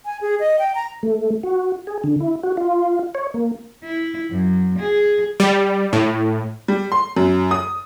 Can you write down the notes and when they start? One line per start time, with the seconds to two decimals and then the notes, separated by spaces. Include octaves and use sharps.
0.05 G#5
0.21 G#4
0.40 D#5
0.59 G5
0.75 A#5
1.03 A3
1.43 F#4
1.87 G#4
2.04 D3
2.20 E4
2.43 F#4
2.57 F4
3.15 C#5
3.34 A#3
3.84 E4
4.31 F#2
4.79 G#4
5.40 G3
5.93 A2
6.68 G3
6.92 C6
7.17 F#2
7.51 D#6